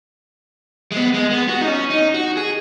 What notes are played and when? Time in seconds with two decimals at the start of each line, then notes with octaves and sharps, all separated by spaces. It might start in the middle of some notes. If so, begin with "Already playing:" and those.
0.92 G#3
0.96 B3
1.14 G#3
1.31 B3
1.49 F#4
1.61 D#4
1.67 C#4
1.90 D#4
2.14 F#4
2.37 G#4